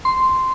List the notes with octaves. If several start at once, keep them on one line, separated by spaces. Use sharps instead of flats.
C6